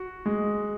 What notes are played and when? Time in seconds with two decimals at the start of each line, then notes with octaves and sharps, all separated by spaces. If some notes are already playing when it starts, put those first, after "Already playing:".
Already playing: F#4
0.26 G#3